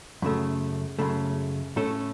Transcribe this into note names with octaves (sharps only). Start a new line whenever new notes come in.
F#2 C#3 A3
F#2 C#3 A3
A2 A3 C#4 A4